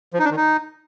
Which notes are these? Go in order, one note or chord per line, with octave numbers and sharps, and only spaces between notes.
F3
D#4
D4
D#3
D#4